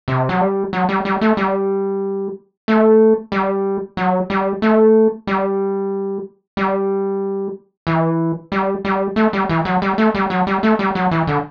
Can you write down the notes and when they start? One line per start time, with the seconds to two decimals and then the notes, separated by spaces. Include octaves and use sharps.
0.08 C3
0.29 F#3
0.41 G3
0.73 F#3
0.89 G3
1.05 G3
1.21 A3
1.37 G3
2.68 A3
3.32 G3
3.97 F#3
4.30 G3
4.62 A3
5.27 G3
6.57 G3
7.87 E3
8.52 G3
8.85 G3
9.16 A3
9.33 G3
9.49 E3
9.65 F#3
9.82 G3
9.98 A3
10.15 G3
10.30 F#3
10.47 G3
10.63 A3
10.79 G3
10.95 F#3
11.11 E3
11.27 D3